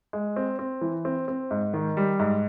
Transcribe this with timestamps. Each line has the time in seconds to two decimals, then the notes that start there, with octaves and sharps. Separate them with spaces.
0.13 G#3
0.36 C4
0.59 C4
0.81 E3
1.05 C4
1.28 C4
1.51 G#2
1.74 D#3
1.97 G3
2.19 G#2